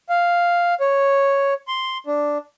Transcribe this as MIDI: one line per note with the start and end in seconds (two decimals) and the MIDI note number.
0.09 0.74 77
0.80 1.54 73
1.68 1.98 84
2.07 2.38 62